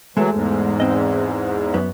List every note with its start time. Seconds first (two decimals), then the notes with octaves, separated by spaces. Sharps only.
0.17 E3 F#3 G#3 A3
0.33 E2 G#2
0.80 C4 D#5
1.74 F#2 B3